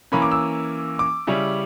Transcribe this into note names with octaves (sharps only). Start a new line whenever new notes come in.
E3 A#3 C#4 B5
D6
E6
D6
C#3 G3 C#4 E4